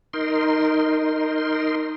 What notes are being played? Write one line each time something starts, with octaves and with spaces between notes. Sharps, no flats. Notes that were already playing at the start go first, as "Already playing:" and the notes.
D#4 A#4 C6